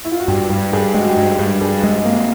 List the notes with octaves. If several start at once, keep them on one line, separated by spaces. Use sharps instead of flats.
E4
F4
F#4
G2 G4
G2
G2 G#4
G4
G#3 F#4
G4
G2
G2
G2 G#4
G#3
A#3